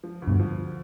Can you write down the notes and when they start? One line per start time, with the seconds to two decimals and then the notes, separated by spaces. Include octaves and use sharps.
0.04 F3
0.22 D2
0.28 G2 B2
0.40 F3